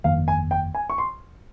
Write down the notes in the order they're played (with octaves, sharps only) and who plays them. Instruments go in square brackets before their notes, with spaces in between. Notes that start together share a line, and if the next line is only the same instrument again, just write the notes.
[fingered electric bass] G1 F2 D#3 A#3 [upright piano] F5
[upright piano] G#5
G5
G#5
C#6
C6